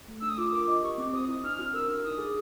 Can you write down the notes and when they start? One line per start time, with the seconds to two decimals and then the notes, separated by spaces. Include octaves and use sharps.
0.08 A3
0.21 D4 E6
0.29 D#6
0.38 F4 D6
0.52 A#4 D6
0.68 D#5
0.83 G4 C#6
0.98 C4 D6
1.13 C5 D#6
1.29 E4
1.43 D4 F6
1.59 F#4
1.74 A#4 E6
1.88 D4
2.04 D#4 D#6
2.18 G#4